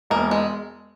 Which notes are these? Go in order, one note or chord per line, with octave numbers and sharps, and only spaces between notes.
E1 A#3
G#3